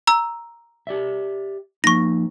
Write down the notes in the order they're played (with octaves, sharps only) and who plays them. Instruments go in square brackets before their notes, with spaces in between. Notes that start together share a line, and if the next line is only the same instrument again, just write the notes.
[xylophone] A#5 E6
[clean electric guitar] G4 D5 E5
[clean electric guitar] F3 A#3 D#4 [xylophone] C#6 A#6